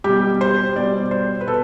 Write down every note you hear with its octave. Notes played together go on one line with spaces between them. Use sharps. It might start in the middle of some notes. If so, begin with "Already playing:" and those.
B2 G3 G4
C5
B2 G3 D5
C5
B4
B2 A4